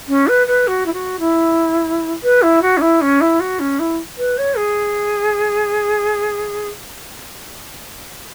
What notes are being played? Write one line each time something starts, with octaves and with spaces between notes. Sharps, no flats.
C#4
B4
B4
F#4
E4
F#4
E4
B4
E4
F#4
C#4
E4
C#4
E4
F#4
C#4
E4
B4
C#5
G#4